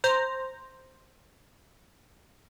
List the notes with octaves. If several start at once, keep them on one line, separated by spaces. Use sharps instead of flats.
C5 A#5